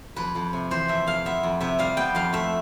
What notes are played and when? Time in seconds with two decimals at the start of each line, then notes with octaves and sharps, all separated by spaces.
0.16 F2 B4
0.35 F2
0.53 C3
0.71 E3 C5
0.88 F2 E5
1.07 F2 F5
1.25 B3 E5
1.43 F2
1.61 C3 E5
1.79 G3 F5
1.97 B3 G5
2.15 F2 F5
2.33 A3 E5